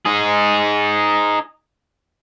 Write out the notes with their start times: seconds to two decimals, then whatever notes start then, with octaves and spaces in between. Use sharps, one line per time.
0.05 D#4 G#4